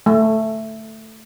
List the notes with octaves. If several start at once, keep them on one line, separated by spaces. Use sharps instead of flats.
A3